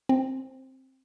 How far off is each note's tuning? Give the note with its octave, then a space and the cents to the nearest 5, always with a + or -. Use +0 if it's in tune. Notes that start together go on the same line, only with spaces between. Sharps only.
C4 +10